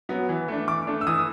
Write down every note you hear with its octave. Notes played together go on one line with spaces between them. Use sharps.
F#3 B3
E3
A3 D4
E3 D6
A3 D4
E6
E3 D#6